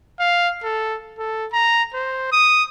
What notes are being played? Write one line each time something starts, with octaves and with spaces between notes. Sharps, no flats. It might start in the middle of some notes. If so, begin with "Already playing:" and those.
F5
A4
A4
A#5
C5
D#6